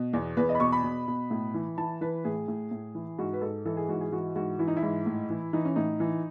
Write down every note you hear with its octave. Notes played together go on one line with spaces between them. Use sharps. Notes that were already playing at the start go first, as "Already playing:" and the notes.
Already playing: B2
E2
E2 B4
D#5
B5
B2 C#6
B5
B2
B2
A2
E3
E3 A5
E3 B4
A2 G#4
A2
A2
E3
G#2 F#4
B4
G#2 A4
E3 A4
G#4
G#2 F#4
G#4
E3 F#4
G#2 F#4
E3 E4
D#4
E4
G#2
A2
E3
E3 D#4
C#4
A2 D#4
E3